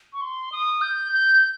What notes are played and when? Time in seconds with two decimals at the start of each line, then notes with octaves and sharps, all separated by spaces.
0.13 C#6
0.21 C6
0.52 D#6
0.81 G6
1.12 G6